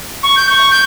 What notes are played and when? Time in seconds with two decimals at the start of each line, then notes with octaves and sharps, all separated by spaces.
0.23 C#6
0.36 G6
0.50 C#6
0.71 G6